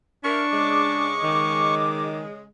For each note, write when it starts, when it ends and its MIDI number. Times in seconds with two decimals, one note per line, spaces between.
0.24 1.11 62
0.24 0.42 64
0.24 0.42 70
0.24 1.75 85
0.52 2.44 49
0.52 2.44 56
0.52 2.14 86
1.23 2.24 51